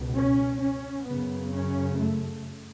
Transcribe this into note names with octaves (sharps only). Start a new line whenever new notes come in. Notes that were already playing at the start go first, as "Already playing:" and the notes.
Already playing: C#2 B2
C#4
C#4
F#2 C#3 B3
C#4
A3